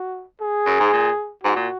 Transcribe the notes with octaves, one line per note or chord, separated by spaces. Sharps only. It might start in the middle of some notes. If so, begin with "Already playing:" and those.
Already playing: F#4
G#4
F#2
G#2
A#2
G#2 F#4
A#2